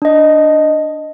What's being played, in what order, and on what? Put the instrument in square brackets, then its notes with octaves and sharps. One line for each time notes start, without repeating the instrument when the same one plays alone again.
[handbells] D4 D#5